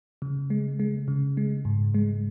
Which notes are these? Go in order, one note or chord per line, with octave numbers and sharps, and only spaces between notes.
C#3
G#3
G#3
C#3
G#3
G#2
G#3